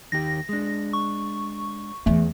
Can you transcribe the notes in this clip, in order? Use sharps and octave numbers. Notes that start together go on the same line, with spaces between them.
D#2 D#3 G4 A#6
G#3 D4
C#6
E2 E3 A3